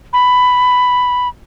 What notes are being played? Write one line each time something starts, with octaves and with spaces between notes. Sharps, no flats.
B5